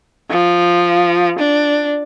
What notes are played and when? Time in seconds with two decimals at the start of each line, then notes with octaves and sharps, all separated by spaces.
0.31 F3
1.39 D4